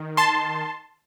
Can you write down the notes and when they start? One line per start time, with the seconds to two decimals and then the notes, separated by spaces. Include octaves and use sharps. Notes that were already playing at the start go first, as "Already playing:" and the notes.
Already playing: D#3
0.17 A5 C6